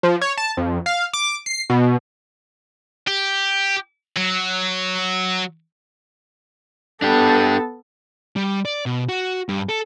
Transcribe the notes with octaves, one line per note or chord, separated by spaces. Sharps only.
F3
C#5
A5
F2
F5
D6
C7
B2
G4
F#3
B3 D4 G4 A4
G3
D5
B2
F#4
G2
A4